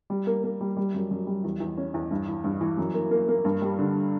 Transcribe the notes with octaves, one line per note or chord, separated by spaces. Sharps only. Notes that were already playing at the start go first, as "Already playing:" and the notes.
G3
A#3
A#3
G3
G3
F#2
F#2
G3
E2
E2
C#4
E2
G2
E3
G2
E3
F#2
A#3
A#3
A#3
G2
G3
D3